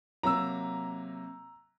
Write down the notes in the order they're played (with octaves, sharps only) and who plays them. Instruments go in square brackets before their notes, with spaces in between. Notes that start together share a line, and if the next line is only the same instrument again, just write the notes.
[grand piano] C3 F#3 A#3 [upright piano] A#5 E6